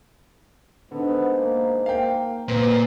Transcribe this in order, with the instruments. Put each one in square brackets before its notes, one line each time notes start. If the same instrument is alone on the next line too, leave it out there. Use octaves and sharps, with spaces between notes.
[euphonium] G#2 [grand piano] D3 [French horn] B3
[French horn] A#3
[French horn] A#3 [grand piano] F5 G5
[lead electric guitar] A#2 [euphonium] B4 [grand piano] C5